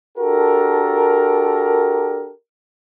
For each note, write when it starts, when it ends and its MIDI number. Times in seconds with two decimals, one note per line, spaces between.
0.18 2.31 62
0.18 2.31 66
0.18 2.31 67
0.18 2.31 69
0.18 2.31 70